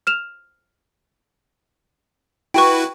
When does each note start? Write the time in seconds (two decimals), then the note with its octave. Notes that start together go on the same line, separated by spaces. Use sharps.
0.07 F6 E7 F7
2.54 E4 F#4 B4 G5 C#6